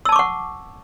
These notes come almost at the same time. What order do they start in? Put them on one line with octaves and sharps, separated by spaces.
E6 A5 D6 C#6 F#5